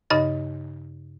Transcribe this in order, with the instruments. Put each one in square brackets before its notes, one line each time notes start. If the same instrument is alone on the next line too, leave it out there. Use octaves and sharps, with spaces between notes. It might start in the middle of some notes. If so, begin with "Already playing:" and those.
[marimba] G2 C#3 D#4 D#5 A6